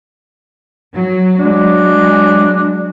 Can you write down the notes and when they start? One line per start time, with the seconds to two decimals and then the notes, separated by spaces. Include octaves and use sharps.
0.93 F#3
1.39 F#3 G#3 D4